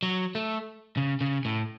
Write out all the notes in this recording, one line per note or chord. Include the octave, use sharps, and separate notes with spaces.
F#3
A3
C#3
C#3
A2